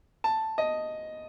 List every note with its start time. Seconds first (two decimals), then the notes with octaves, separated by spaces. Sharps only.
0.24 A5
0.58 D#5